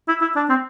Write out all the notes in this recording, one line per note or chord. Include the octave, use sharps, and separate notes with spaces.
E4
E4
D4
C4